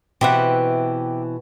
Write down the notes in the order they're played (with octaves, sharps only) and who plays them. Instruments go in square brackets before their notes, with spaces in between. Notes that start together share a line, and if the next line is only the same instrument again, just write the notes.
[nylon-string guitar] B2 E3 C4 [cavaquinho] G4 E5 F#5